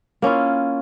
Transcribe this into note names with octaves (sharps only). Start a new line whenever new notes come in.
A#3 C#4 E4 F4